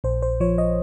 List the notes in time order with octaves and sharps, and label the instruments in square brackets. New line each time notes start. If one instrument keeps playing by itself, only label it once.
[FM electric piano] A#1 C5
C5
F3 C#5
D#5